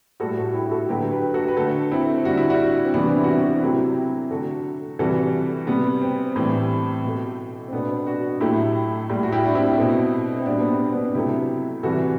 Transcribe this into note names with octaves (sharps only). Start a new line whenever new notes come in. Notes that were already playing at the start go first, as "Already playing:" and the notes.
A2 G3 F#4 A4
F#4 A4
E4 G4
F#4 A4
D3 F#3 A3 G4 B4
G4 B4
F#4 A4
B4
D3 A3 F#4 A4
C4 E4
D3 G3 F#4
E4
D4 F#4
C4
C3 E3 G3 B3 D4
E4
F#4
C4 E4
D4 F#4
C3 F#3 A3 E4 G4
D3 A3 F#4 A4
C3 E3 G3 F#4 A4
C3 G3 B3
C4
A2 E3 G3
B2 A3
C4
B2 A3 B3 D4
D4 F#4
A2 F#3 A3 E4 G4
A2 G3
F#4
E4 G4
D4
C4 E4
B2 A3
C4
B2 G3 B3 D4
B3
C4
C4
B3 D4
C3 F#3 A3 E4 G4
C3 E3 G3 F#4 A4